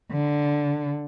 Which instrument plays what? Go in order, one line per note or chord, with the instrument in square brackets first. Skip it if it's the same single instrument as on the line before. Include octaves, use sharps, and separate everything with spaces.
[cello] D3